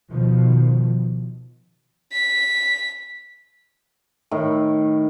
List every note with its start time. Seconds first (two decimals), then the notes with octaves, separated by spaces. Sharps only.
0.10 B2 D#3 F3
2.13 B6
4.31 A2 D#3